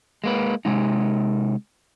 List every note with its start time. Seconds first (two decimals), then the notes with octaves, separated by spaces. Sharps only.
0.24 G#3 A#3 B4
0.65 C3 G#3 D#4